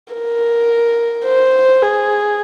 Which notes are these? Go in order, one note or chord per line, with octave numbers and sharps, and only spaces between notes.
A#4
C5
G#4